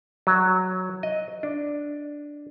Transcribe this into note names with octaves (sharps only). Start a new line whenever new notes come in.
F#3
D#5
D4